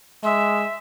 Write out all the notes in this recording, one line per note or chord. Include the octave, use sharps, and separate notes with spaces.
G#3 E5